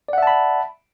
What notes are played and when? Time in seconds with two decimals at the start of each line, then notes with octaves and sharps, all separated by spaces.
0.09 D5
0.13 F#5
0.18 E5
0.23 A5
0.27 B5